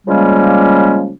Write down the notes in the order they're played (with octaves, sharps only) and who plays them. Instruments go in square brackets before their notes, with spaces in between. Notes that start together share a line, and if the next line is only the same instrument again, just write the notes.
[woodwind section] C#3 F3 G3 G#3 A#3 C#4